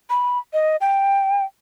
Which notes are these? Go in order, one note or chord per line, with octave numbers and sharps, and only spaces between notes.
B5
D#5
G5